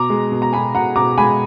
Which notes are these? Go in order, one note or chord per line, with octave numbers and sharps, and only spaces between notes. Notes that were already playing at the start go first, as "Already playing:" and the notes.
Already playing: B2 A#5 D6
G#3
B2
A#5
B2 G#5 B5
B2 F#5 A#5
B2 A#5 D6
G#3 G#5 B5